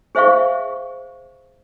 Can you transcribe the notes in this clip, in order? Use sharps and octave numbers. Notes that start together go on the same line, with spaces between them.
G#4 C5 E5 F5 C#6